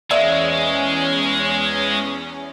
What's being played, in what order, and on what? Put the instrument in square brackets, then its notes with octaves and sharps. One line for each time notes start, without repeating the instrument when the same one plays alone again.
[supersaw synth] E2 C#4 [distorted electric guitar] G#3 [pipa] A#3 D5 E5